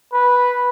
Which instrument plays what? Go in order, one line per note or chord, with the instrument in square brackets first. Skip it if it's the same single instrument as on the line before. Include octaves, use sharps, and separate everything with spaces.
[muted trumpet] B4